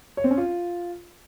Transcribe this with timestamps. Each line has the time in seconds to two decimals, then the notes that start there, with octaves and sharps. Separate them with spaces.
0.17 C#5
0.24 C4
0.31 C#4
0.37 F4